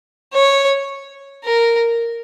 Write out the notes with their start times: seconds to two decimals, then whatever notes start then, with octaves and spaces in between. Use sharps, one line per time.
0.34 C#5
1.45 A#4